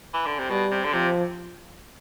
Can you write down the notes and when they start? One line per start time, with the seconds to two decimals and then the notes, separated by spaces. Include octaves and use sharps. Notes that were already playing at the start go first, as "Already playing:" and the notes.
0.14 E3
0.26 D3
0.39 C3
0.50 B2 G3
0.71 C3
0.84 D3
0.93 C3 F3